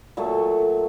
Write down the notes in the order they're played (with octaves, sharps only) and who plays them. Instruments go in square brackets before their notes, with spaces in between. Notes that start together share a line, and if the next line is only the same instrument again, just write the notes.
[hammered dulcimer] A#2 F#3 A3